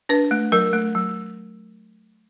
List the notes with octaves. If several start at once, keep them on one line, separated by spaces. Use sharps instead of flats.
D4 B4
A3
F#3 A#4
A3
F#3